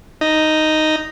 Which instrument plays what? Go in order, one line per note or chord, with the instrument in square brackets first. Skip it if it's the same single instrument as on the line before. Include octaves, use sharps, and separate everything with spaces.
[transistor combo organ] D#4